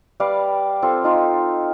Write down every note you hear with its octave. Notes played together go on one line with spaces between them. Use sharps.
G3 B4 D5 F5
C4 F4 A4
D#4 F4